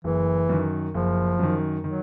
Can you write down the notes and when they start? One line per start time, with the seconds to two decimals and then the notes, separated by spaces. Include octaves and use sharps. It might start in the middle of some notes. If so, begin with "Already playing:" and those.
0.04 F#1 E3
0.49 F#2 D#3
0.94 F#1 F3
1.39 F#2 D#3
1.84 D#3 F#3